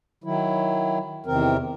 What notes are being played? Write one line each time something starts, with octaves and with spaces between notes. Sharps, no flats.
D#3 F#3 E4
E2 C3 D#3 C4 A#4